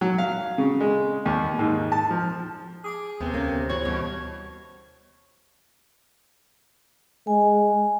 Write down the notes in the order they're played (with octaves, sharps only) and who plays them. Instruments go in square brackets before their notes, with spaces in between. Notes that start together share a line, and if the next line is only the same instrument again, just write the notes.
[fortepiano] F#3
F5
C#3
G#3
D#2
G#2
A5
F3
[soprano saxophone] G#4 [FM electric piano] G#5 D6 D#6
[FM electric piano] D#2 B3 [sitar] C3
[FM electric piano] D2 B3 [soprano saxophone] A#3 [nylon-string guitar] C#4
[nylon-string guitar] E3 F#4 [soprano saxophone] C#5
[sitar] B2 [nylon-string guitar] G3
[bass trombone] G#3 [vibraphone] G#5